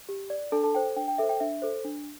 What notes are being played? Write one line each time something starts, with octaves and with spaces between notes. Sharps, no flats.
G4
D5
D4 A4 A5
A4 A5
A4 C5 G5
D4 G5
G5
A4 C5 E5
G5
D4 E5
A4 C5
D4